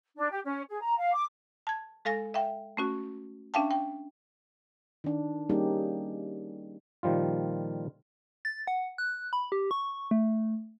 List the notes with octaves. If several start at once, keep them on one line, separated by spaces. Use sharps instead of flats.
D4
G4
C#4
G#4
A#5
F5
D6
A5 G#6
G#3 A4 F5 G#5 A#6
E5 F5 G5
A3 C#4 F#4
C#4 D4 E5 F5 G5 A5
G5
D#3 D4
G3 A#3 C#4 D#4 G4 G#4
A#2 D#3 F3 G3 F4
A6
F#5
F#6
B5
G4
C#6
A3